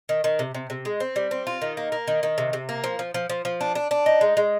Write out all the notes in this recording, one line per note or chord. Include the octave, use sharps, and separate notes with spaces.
D#3
D#3
C3
C3
C3
G#3
C4
G3
C4
F4
D#3
A#3
A#3
D#3
D#3
C3
C3
A#3
F3
F3
F3
F3
F3
D4
D4
D4
D#4
G#3
G#3